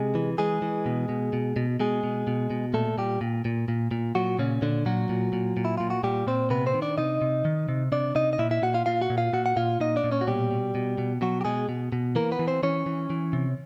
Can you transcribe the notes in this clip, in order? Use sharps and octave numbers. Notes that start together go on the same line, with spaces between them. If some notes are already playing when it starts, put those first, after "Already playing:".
Already playing: C3 G#3 G#4
E3
E3 G#3 G#4
E3
B2
B2
B2
B2
B2 G#3 G#4
B2
B2
B2
A#2 A3 A4
A#2 G3 G4
A#2
A#2
A#2
A#2
A#2 F#3 F#4
A#2 C#3 C#4
A#2 D3 D4
A#2 F#3 F#4
A#2
A#2
A#2
E4
A#2 F4
F#4
A#2 G3 G4
A#2 C4 C5
C3 B3 B4
C4 C5
D#3
D4 D5
C3 D#4 D#5
C3
D#3
C3
C3 D4 D5
C3 D#4 D#5
D#5
A#2 E4 E5
E4 E5
A#2 F#4 F#5
F4 F5
A#2 F4 F5
F#4 F#5
A#2
F4 F5
A#2 F#4 F#5
F#5
A#2 F4 F5
A#2 D#4 D#5
D4 D5
A#2
C#4 C#5
F#4
B2 G3 G4
B2
B2
B2
B2 F#3 F#4
G4
B2 G#3 G#4
B2
B2
E3 A#3 A#4
B3 B4
E3
C4 C5
E3 C#4 C#5
E3
E3
C3